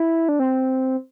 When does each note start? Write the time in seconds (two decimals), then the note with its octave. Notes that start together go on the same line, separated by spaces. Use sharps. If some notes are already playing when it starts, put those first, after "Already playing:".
Already playing: E4
0.29 D4
0.39 C4